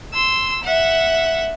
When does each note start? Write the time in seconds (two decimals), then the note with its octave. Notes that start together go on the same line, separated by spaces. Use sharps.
0.13 C6 E6
0.64 E5 F#5